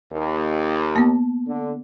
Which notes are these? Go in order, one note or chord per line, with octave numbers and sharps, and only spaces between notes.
D#2
A#3 B3
D3